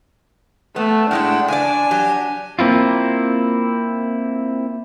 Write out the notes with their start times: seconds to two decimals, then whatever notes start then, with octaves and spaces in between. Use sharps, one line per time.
0.76 A3 B3
1.11 A2 G#3 D4 E4 F#5 G5
1.48 C#3 D5 G#5
1.91 F#3 G4
2.59 A#3 C4 E4 F4